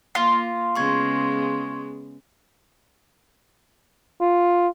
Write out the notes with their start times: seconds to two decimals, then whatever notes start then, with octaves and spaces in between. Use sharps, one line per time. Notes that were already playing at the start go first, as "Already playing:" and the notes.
0.15 A#3 F4
0.76 C#3 G#3 B3 C6 C#6 G#6
4.21 F4